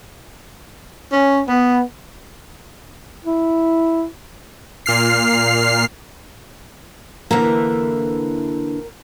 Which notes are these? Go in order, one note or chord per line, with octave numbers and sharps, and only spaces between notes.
C#4
B3
E4
A#2 F6 C7
D3 E3 A#3 A#4